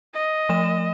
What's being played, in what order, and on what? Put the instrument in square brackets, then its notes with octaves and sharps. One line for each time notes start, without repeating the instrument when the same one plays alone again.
[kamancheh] D#5
[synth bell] F3 A3 E7